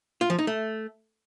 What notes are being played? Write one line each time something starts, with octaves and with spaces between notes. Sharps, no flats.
F4
F3
D#4
A3